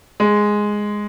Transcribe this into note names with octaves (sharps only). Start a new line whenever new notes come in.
G#3